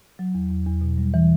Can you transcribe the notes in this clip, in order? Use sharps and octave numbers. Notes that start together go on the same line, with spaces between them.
F#3
E2
E2
E2
B2
G3
E3